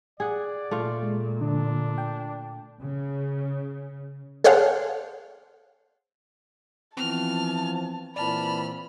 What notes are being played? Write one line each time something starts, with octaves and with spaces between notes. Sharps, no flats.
G#4 D5 F#5
A#2 A3 F4 F5
G#3
D3 D4
G5
C#3
G#4 A4 C5 C#5 F5 F#5
E3 F3 B3 C4 A5 F6
A#2 E3 C4 D5 A5 B5 F6